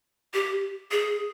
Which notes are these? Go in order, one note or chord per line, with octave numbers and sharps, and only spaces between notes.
G4
G#4